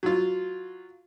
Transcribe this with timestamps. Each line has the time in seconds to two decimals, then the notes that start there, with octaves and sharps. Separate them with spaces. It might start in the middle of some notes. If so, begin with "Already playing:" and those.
0.03 F#3 F4